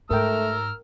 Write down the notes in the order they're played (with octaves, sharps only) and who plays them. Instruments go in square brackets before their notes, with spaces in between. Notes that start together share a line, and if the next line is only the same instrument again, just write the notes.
[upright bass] G#2 [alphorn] A3 [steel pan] A#4 G5 [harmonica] A#5 E6 F6